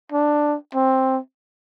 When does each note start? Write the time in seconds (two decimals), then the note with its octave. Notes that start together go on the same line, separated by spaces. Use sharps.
0.12 D4
0.75 C4